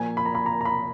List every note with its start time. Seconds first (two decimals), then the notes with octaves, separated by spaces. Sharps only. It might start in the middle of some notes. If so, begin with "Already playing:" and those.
Already playing: A#2 F3 A#3 G#5
0.17 B5
0.26 A#5
0.35 B5
0.46 A#5
0.61 A#5
0.65 B5